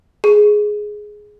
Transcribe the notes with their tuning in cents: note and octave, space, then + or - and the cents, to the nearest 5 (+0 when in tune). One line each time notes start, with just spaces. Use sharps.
G#4 +5